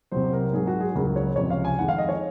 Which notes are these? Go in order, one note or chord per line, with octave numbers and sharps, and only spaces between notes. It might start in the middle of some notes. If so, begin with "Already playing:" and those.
C2 C3 F#3 C5
A#4
G#2 F#3 G#4
F#4
G#4
C#2 C#3 F#3 A#4
C#5
C#2 C3 F3 C#5
F5
G#5
F2 D#3 G#3 F#5
F5
D#5
C#5